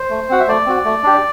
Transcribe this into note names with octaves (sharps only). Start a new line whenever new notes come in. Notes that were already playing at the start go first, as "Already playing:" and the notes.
Already playing: C5
A3
C4 F#4 F#5
E5
A3 D5
C4 F#4
A3
D4 G4